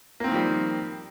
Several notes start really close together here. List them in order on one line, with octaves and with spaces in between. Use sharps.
A#3 C4 D#3 F3 G3